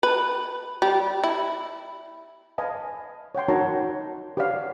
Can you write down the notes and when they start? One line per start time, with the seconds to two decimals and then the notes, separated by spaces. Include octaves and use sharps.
0.03 B4
0.82 G3
1.24 E4
2.58 B4 D#5 F5 G#5 A5
3.35 C#5 F#5 G5 C6
3.48 D#4 F#4 A#4 C#5 A5 A#5
4.37 G4 B4 C#5 D5 F5 F#5